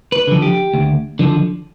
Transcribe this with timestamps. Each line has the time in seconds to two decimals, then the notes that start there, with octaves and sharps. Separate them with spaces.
0.12 B4
0.27 D3 F3
0.42 G4
0.74 D2
1.19 D3 F3